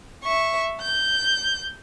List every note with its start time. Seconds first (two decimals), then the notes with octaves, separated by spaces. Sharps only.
0.24 E5 C#6
0.81 G6